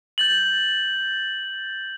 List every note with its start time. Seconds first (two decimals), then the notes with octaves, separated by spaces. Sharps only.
0.18 G6 A6 F#7